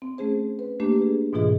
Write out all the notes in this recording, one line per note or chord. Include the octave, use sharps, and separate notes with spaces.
C4
A3 C#4 G#4 C5
B4
A3 A#3 D4 G4
G#4 B4
G#2 B2 E3 F4 G#4 D#5